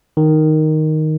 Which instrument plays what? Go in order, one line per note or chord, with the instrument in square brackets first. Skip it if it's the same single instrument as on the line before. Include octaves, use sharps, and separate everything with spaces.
[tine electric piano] D#3